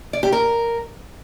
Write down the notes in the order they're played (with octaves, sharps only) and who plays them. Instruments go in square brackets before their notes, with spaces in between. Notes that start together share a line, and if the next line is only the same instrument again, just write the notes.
[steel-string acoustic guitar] D5
G4
A#4